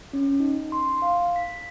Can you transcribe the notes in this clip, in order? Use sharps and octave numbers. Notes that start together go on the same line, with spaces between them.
C#4
D#4
C6
F5
B6